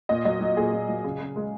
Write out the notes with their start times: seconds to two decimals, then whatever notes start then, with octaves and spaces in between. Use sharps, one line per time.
0.09 A#2 D#5
0.25 F#3 D#5
0.41 F#3
0.57 A#2 G#4
0.73 A#2
0.89 F#3
1.04 C#3
1.20 C#3
1.36 G#3